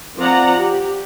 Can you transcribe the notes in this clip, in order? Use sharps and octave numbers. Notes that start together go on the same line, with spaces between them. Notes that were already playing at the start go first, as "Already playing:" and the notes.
F3 C4 D5 F#5 A#5
G4